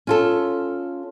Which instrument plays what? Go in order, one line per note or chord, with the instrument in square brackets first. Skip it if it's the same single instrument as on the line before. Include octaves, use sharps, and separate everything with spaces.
[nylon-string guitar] C#4 F4 A4